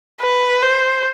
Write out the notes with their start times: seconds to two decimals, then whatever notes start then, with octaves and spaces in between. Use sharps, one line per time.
0.21 B4
0.62 C5